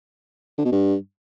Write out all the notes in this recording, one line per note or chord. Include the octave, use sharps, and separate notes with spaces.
D3
B2
G2